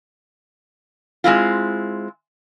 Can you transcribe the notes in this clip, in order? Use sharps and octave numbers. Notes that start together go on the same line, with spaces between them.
G#3 C4 E4 F4